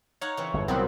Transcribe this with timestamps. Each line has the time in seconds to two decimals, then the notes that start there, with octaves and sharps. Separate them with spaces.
0.21 D#4 C#5 F5 F#5
0.37 C#3 E3 C4
0.54 G1 F2 G#2
0.68 C2 F#2 A#2 F#3 B3 C4 B5